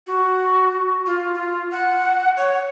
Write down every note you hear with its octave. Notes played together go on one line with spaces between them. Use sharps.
F#4
F4
F4
F#5
C#5